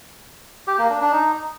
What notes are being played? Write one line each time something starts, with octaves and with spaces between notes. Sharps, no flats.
G4
A#3
D4
D4
D#4